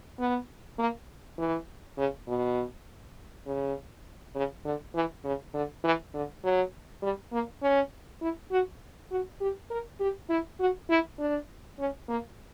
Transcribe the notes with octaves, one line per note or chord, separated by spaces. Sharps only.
B3
A#3
E3
C#3
B2
C#3
C#3
D3
E3
C#3
D3
E3
D3
F#3
G3
A#3
C#4
E4
F#4
F#4
G4
A#4
G4
E4
F#4
E4
D4
C#4
A#3